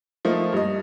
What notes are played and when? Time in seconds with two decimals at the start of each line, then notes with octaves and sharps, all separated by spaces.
0.25 F3 A3 A#3 D#4
0.53 G2 D#5